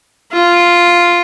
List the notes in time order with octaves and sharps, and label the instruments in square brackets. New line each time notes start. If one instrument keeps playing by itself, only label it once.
[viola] F4